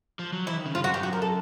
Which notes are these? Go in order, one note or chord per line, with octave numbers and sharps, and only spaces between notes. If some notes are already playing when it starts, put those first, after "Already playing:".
F3
F#3
E3 E4
D#3
C#3
G2 F4
F#2 F#4
G2 G4
F#2 F#4
A#4
A4